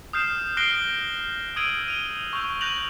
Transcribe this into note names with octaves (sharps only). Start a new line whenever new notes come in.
D#6 F6 G6 C7 E7
D#6 F#6 A#6 C7 D7 G7
D#6 E6 G#6 D7 D#7 F#7
D#7 F7 G7
C#6 E6 G6 F7
F#6 G6 A#6 D#7 F7 F#7